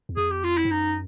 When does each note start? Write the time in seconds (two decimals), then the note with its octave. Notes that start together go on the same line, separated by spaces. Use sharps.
0.09 E2
0.17 F2 G#4
0.31 G4
0.44 F4
0.57 E4
0.65 G2
0.71 F#2 D#4